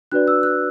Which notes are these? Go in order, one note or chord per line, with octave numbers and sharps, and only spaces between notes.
D4 F#4 B4 D5 F#6
E6
F#6